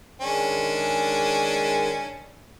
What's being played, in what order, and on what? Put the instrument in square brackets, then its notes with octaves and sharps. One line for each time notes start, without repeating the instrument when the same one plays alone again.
[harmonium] D#3 G#3 [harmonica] C#4 D4